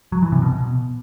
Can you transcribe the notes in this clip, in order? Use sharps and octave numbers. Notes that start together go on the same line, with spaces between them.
F#3
E3
C3
B2